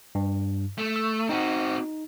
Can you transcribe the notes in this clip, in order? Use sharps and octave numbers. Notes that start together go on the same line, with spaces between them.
G2
A3
E6
C4 D#4 F#4